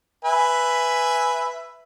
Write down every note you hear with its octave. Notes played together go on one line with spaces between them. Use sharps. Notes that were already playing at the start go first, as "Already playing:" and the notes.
B4 E5 G#5